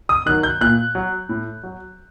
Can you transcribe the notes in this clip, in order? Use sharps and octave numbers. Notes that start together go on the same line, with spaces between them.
D#6
D#3 F#3 F#6
G6
A#2 F#6
F#3
A2
F#3